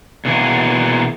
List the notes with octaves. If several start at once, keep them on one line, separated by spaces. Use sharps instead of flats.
B2 E3 A#3 G#4